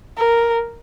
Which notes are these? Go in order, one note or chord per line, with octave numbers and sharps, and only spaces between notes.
A#4